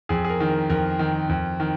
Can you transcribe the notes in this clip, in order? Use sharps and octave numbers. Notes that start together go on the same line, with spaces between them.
F2 G#4
G#4
A#4
D#3
A#4
F2 A#4
D#3
F2
D#3